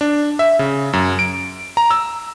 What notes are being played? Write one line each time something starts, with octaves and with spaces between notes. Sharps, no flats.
D4
E5
C#3
F#2
D7
A#5
E6